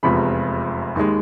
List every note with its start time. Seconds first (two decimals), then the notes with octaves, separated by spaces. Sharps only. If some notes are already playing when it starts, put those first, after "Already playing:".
0.03 F1 E2 C3 F3 G#3 B5
0.96 D#2 D#3 G#3